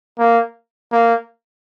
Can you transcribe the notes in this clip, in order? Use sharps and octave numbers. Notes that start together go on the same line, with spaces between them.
A#3
A#3